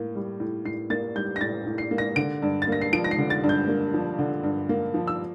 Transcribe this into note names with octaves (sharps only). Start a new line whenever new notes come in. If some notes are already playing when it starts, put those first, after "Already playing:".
Already playing: A2 A#3
G3
A2
A2 C7
A#3 A6
G3 G6
A#6
A2 A6
A2
C7
A#3
A#6
D3 D7
G2
A6
A#3 A#6
C7
F3 D7
A#6
C7
D3
A6
G2
G6
A#3
F3
D3
G2
A#3
F3
E6